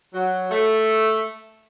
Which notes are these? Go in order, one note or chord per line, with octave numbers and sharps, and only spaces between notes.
F#3
A3